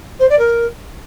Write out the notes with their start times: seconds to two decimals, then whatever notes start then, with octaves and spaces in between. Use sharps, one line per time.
0.19 C5
0.29 D5
0.39 A#4